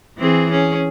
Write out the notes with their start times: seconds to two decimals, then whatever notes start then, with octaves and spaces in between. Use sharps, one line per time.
0.18 E3 C4 G#4
0.51 C#4 G#4